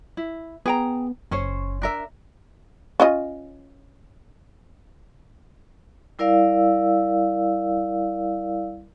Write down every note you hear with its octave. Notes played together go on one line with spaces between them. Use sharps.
E4
B3 G#4 G5 A#5
F#1 C#4 C5 C#5
D4 A#4 E5
C#4 F4 D#5
G3 E4 A#4 D5 F5 E6